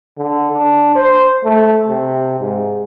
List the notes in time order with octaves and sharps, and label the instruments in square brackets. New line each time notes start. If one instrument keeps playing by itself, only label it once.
[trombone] D3
D4
C5
A3
C3
G#2